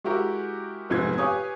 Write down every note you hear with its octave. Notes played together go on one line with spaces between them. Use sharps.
G#3 E4 F#4 G4 A#4
F1 A#1 G#2 C3 B3 G#6
G4 B4 C#5 F5 G#5 D#6